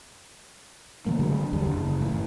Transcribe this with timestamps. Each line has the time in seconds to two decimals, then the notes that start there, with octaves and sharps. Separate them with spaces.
1.06 C#3 E3 A3 A#3
1.20 D3 F#3 G#3 D4
1.52 G#1 E2 D3 G3
1.66 F#1
2.01 A2 E3